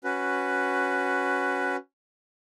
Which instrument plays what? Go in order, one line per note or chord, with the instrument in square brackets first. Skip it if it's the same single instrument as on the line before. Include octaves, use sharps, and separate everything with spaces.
[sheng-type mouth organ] C#4 F#4 B4